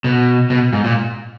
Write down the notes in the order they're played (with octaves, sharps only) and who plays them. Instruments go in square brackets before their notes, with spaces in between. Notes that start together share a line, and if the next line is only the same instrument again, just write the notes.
[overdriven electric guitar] B2
B2
G#2
A#2